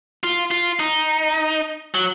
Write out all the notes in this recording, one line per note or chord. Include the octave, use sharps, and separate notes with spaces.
F4
F4
D#4
F#3